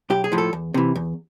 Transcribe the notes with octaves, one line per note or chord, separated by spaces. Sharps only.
B1 G4
G#4
A2 F3
A4
E2
C3 E3
E2